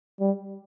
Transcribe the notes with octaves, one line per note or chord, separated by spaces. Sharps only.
G3